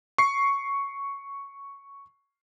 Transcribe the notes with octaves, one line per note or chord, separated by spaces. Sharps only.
C#6 C7